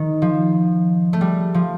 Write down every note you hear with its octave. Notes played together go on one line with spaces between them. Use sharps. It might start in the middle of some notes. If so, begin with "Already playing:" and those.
Already playing: D#3
F3
A3
G3
F3